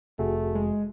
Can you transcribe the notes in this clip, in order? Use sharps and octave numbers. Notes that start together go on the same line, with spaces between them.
F1 F2 C3 A3 F#4 G#4
G#3